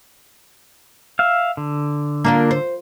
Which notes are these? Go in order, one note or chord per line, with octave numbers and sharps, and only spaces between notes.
E5 F5
D3
A#3 D4 F4
C5